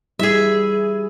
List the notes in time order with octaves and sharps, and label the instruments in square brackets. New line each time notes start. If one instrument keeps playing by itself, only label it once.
[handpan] G3 E4 [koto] G#4 E5